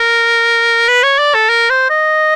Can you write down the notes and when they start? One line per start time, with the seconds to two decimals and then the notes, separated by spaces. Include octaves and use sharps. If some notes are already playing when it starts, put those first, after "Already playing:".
Already playing: A#4
0.88 B4
1.03 C#5
1.19 D5
1.35 A4
1.49 A#4
1.70 C5
1.90 D#5